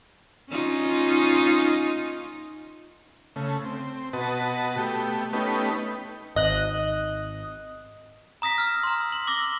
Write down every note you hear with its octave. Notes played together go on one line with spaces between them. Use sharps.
C#4 D#4 F4
C#3 A3
C4
B2 F#4 B4 D#5 A5
A3 B3 G4
A3 B3 C#4 D#4 G4 B4
G#1 D#5 F#6
A#5 D#6 A#6 B6
E6 F6
A#5 C6
F#7
D6 E6 A#6 F#7 G7